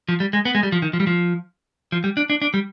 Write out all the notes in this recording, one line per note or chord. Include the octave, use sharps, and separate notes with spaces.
F3
G3
G#3
B3
G#3
G3
F3
D#3
F3
G3
F3
F3
G3
D4
D4
D4
G3